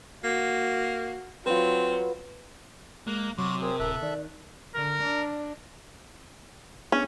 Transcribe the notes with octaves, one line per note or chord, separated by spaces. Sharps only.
A#3 F#4
F#3 C4 F4 B4
G#3 A#3 F#6
C3 F#3 F#4 C6 D6
C4 G#4 A#4
D1 A4 E5 F#6
D#3 D5
D3 A#4
D4
B3 C#4 D4 G#4